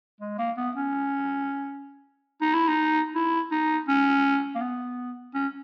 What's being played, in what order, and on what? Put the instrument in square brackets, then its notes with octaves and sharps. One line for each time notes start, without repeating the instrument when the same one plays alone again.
[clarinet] G#3
A#3
B3
C#4
D#4
E4
D#4
E4
D#4
C#4
A#3
B3
C#4